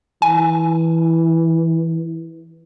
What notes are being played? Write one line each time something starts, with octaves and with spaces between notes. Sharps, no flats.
E3 G#5